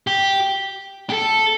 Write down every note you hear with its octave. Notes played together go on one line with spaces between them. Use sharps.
G4
G4
A4